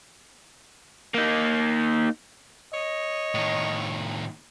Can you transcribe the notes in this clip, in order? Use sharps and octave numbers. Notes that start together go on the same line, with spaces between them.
A#3 D#4
C#5 D#5
A2 D#3